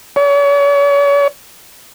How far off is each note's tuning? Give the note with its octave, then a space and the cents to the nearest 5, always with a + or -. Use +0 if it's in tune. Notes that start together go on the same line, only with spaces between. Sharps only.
C#5 +40